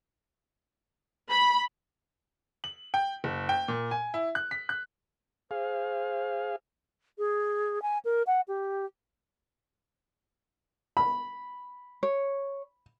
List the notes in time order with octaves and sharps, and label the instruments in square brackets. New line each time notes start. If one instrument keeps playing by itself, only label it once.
[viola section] B5
[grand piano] F#7
G5
F#1
G5
A#2
G#5
E4
F#6
B6
F#6
[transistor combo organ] G#4 F5 [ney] C5
[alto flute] G#4
G#5
A#4
F#5
G4
[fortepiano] B5
[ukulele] C#5